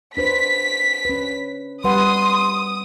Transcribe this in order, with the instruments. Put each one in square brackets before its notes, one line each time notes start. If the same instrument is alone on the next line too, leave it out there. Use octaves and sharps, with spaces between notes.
[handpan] D4 B4 C5 [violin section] B6
[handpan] C#4 B4
[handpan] G3 B4 F#5 [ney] C6 [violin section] D#6